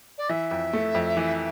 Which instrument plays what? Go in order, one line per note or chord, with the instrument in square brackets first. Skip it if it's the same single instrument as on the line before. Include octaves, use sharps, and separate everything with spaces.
[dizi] D5
[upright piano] E3 [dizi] E5
[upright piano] F2
A3
F2
E3